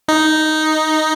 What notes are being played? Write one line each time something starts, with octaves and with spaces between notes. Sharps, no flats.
D#4